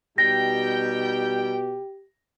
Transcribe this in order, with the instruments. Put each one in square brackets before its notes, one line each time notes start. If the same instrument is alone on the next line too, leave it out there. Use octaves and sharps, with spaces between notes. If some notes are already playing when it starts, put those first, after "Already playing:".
[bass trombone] B2 [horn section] G3 D#4 G5 [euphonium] G4 [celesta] A#6